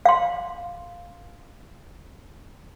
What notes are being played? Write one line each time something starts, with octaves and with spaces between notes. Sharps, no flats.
F5 C6